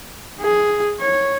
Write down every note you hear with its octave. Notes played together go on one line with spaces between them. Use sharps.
G#4
C#5